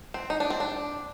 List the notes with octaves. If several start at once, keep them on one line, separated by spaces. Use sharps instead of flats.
C4
D#4
D4
C4
D4